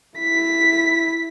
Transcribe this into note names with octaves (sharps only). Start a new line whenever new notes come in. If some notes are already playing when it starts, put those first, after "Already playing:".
E4 B6